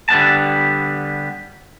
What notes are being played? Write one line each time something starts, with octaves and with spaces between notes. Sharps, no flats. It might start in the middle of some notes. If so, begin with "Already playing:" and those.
D3 G3 B3 A5